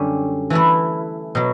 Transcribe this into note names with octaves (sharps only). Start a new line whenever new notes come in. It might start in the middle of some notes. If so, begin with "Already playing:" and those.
Already playing: F#2 D3 G3 C#4 G4
E3 A3 E4 B4
B2 F#3